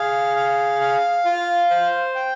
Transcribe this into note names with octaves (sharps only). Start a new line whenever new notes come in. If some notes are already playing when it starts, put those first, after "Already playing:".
Already playing: G#4 F5
F5
F5
F4
C5
G5